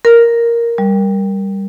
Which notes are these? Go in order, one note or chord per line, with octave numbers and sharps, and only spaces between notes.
A#4
G3